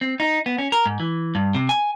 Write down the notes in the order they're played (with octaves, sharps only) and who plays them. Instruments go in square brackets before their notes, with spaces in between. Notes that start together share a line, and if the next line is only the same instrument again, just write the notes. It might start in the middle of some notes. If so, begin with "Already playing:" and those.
[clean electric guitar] C4
D#4
B3
C#4
A#4
G#2
E3
G2
C3
G#5